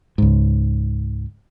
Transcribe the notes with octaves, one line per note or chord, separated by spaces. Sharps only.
C#2 G#2